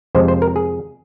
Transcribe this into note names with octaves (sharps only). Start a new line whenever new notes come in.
F2 C3 F3 G#3 C5
C5
A#4
G#4